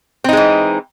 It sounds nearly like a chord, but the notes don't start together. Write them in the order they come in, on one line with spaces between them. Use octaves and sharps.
C4 D#4 G#3 E3